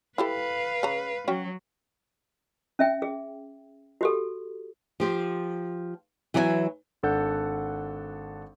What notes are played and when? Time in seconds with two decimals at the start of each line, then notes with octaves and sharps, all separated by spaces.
0.18 E4 G4 A4 B4 F5
0.83 C#3 A#5
1.28 F#3 C#4 F#4 G5
2.79 C#4 E5 G5
3.02 G#4
4.01 F#4 G4 A4
5.00 F3 G4 C5
6.34 E3 F#3 C#5 D5 E5 G#5
7.03 G#1 D4 A4 F#5 G6